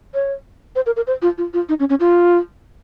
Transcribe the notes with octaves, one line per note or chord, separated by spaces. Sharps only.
C#5
C5
A#4
A#4
C5
F4
F4
F4
D#4
C#4
C#4
F4